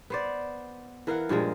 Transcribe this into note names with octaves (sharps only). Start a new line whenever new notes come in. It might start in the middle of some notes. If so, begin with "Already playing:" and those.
B3 C5 D5
E3 A#4 F5 F#5
G2 A#2 F3 G#3